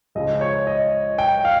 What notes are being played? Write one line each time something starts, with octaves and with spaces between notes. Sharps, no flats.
C#2 C#3 F3 D#5
C#5
D#5
G5
F5